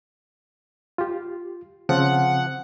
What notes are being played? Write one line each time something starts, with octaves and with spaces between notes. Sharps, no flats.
F4 G4
C#3 F3 C4 F#5